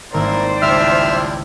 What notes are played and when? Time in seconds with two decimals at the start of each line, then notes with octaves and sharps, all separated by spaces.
0.14 G#1 A#3 E4 A#4 C5 D5 A#5
0.62 C#2 F3 E4 G4 E5 E6 F6